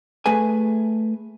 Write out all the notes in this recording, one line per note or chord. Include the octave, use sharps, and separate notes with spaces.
A3 G#4 B4 G#5